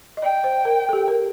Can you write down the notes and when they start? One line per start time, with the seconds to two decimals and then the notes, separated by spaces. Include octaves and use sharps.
0.17 D#5
0.22 D5 G5
0.44 C5
0.65 A#4
0.89 A4
0.93 G4
1.08 A#4